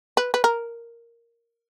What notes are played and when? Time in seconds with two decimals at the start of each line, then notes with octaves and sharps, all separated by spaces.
0.17 B4
0.34 B4
0.44 A#4